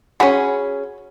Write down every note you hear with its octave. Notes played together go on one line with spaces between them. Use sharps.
C#4 F#4 G#4 B5